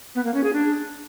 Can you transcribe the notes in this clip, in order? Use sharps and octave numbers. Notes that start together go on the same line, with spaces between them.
B3
A#3
C#4
G#4
D4